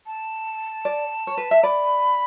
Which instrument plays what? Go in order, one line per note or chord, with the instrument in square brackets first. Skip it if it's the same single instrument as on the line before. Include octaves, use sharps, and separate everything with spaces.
[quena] A5
[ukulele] D5
C#5
B4
E5
[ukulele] D5 [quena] B5